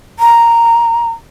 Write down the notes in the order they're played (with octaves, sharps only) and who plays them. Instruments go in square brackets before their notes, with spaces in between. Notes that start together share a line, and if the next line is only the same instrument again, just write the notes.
[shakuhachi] A#5